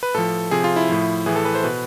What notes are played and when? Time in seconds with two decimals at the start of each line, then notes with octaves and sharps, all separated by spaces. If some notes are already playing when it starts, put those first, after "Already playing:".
0.03 B4
0.14 A2 F3 A4
0.51 C3 F3 G#4
0.64 F4
0.76 E4
0.89 A2 F3
1.26 A2 E3 G#4
1.36 A4
1.45 B4
1.55 C5
1.64 B2 B4